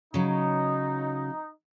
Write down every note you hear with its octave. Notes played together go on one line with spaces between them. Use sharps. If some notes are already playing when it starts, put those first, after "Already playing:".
C#3 F#3 D#4